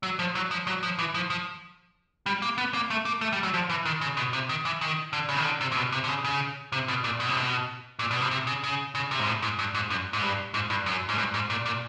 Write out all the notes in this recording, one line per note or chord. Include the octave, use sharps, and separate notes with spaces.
F#3
F3
F#3
F3
F#3
F3
E3
F3
F3
G3
A#3
B3
A#3
A3
A#3
A3
G3
F#3
F3
E3
D#3
C#3
B2
C3
D#3
E3
D#3
D3
C#3
D#3
D3
C3
A#2
B2
C3
D3
C#3
C#3
C3
B2
A#2
B2
C3
B2
A#2
B2
C3
C3
C#3
C#3
C#3
C3
G#2
A2
G#2
G2
G#2
F#2
G#2
G2
G#2
G2
F#2
G#2
G2
G#2
A#2
A#2